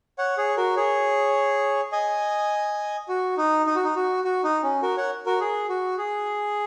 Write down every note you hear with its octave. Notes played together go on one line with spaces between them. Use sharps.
C#5 F#5
G#4 C#5
F#4 A#4
G#4 C#5
D#5 G#5
F#4
D#4
D#4
F#4
D#4
F#4
F#4
D#4
C#4
F#4 A#4
C#5 F#5
F#4 A#4
G#4
F#4
G#4